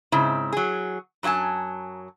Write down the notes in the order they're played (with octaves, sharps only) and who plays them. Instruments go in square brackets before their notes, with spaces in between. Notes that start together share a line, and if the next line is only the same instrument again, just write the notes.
[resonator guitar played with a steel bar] G#2 C#3 C4 E4
F#3 G#4
F#2 F#3 F4 G#5 A5